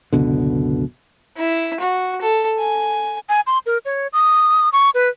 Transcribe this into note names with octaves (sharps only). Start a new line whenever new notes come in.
F#1 C#2 B2 D3
E4
F#4
A4
G#5
G#5
C6
A#4
C#5
D#6
C#6
B4